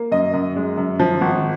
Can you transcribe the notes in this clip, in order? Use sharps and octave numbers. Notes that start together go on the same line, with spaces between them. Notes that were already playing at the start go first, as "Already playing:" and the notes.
Already playing: A#3
F#2 D#5
F#2
G#3
F#2
F3
G#1